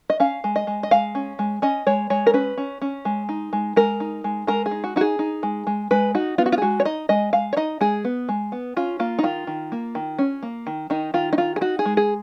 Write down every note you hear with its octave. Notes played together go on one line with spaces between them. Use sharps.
D#5
C#4 F5
G#3
D#5
G#3
D#5
G#3 F5
C#4
G#3
C#4 D#5
G#3 C#5
G#3 C#5
A#4
C#4 B4
C#4
C#4
G#3
D#4
G#3
G#3 A#4
D#4
G#3
G#3 A#4
G#4
D#4
F#4
D#4 F#4
G#4
D#4
G#3
G#3
G#3 B4
D#4 F#4
B3 F4
F#4
F4
G#4
G#3 F#4
C#5
D#4 D#5
G#3 D#5
G#3 F5
C#5
D#4 D#5
G#3 G#4
B3
G#3
B3
C#4 F4
A#3 F4
D#4
D#3 F4
D#3
A#3
D#3
C#4
A#3
D#3
D#3 D#4
D#3 F4
D#4
D#3 F4
G#4
D#4 F#4
G#4
G#3
G#4